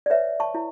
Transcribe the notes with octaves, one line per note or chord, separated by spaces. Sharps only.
D5
B4 C#5 E5
A5 C#6
E4